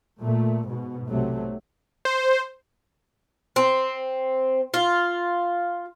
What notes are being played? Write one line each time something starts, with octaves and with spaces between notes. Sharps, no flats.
A#2 A3
G#2 B2
B1 C3 F#3 A3
C5
C4
F4